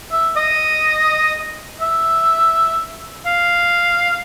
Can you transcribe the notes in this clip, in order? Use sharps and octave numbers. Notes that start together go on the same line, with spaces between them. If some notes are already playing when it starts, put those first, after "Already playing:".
E5
D#5
E5
F5